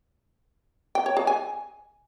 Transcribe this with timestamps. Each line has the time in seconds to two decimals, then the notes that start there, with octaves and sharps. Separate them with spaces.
0.95 G5
1.06 C#5
1.17 G#4
1.27 G#5